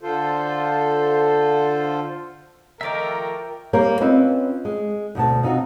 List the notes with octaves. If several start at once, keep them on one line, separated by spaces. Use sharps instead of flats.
D3 F4 A4 C5
D#3 F3 A3 A#4 E5 G5 A#5 D6
G3 A#3 G4 A#4 C#5
C4 C#4 F4 B4 D#5 E5
G#3
D2 B2 A5
C3 D#4 F4 F#4